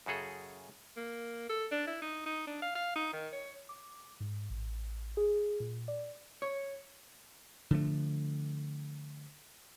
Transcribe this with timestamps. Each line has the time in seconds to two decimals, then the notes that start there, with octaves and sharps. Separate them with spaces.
0.06 F#2 C#3 F#4 G#4 A4
0.97 A#3
1.49 A4
1.71 D4
1.87 E4
2.02 D#4
2.26 D#4
2.47 D4
2.62 F5
2.75 F5
2.96 D#4
3.13 D#3
3.33 C#5
3.69 D6
4.20 G#2
4.50 A1
5.17 G#4
5.60 A#2
5.88 D5
6.42 C#5
7.71 D3 F3 A3